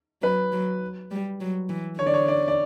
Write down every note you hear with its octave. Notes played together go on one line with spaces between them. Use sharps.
F#3 B4
F#3
G3
F#3
E3
D3 C#5
D5
C#5
D5
D5